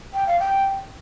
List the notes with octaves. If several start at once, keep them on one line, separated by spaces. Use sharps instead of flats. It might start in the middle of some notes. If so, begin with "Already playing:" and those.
G5
F5
G5